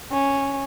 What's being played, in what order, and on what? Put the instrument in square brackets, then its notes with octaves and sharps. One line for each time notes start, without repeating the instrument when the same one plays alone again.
[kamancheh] C#4